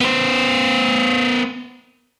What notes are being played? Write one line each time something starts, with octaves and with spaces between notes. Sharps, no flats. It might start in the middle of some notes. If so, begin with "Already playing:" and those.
B3 C5